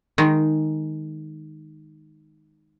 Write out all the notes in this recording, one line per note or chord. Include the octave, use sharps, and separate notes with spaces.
D#3 G#3